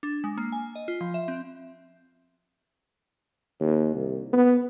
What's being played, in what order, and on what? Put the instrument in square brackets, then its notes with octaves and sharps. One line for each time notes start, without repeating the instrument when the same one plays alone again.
[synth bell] D4
G#3
A#3
G#5
D#5
F4
F3
E5
C4
[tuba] D#2
C2
B3